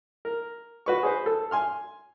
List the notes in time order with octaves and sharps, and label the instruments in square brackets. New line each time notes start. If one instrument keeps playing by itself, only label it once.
[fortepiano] A#4
F#4 B4 C#6
G#4 B4 C5
A4
G#5 C6 F6